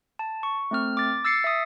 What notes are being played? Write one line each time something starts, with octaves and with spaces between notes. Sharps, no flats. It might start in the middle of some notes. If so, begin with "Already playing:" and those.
A5
C#6
A3 C4 F6
D6 A6
E6 A6 C7 C#7
E5 D#6